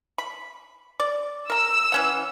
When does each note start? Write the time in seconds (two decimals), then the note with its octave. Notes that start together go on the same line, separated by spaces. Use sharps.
0.18 B5
1.00 D5
1.50 A#4 A#5 E6
1.92 E3 C#4 F#5